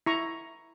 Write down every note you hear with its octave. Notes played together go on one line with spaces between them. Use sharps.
E4 A#5 C#6